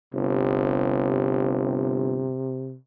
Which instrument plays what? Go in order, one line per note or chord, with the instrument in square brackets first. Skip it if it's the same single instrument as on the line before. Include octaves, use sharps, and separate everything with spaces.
[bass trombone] G1 [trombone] C3